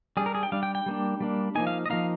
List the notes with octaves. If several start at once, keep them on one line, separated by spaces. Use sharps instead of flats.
G3 D4 G#4
A#4
G#4
G5
G3 D4 F5
G5
G5
G3 A#3 D4
G3 A#3 D4
F3 A#3 D#4 G#5
F5
D#5
F3 A#3 D#4 F5